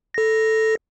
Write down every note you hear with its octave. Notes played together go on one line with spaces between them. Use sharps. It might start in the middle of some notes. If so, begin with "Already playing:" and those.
A4 A#6